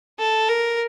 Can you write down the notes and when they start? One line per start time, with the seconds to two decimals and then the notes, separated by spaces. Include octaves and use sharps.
0.19 A4
0.48 A#4